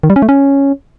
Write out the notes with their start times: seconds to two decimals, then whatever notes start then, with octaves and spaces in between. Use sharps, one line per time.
0.03 D#3
0.10 G3
0.16 C#4
0.22 A3
0.29 C#4